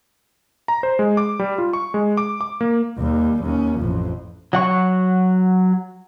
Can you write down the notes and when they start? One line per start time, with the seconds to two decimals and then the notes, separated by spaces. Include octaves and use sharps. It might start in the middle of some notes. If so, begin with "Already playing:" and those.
0.68 A#5
0.83 C5
0.99 G#3
1.17 D6
1.39 G3
1.58 F4
1.73 C#6
1.94 G#3
2.17 D6
2.41 D6
2.61 A#3
2.98 D#2 G3
3.43 D#2 C#4
3.79 A1 F2
4.53 F#3 F#5 C#6